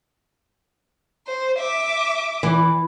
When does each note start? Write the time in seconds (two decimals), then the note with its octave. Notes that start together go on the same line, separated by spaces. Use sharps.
1.27 C5
1.59 E5 D6
2.43 E3